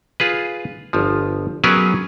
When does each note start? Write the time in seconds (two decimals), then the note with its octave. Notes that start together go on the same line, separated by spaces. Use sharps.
0.20 F4 G#4 B4
0.93 G1 F3
1.64 F#3 B3 C#4 G#4 A#4 B4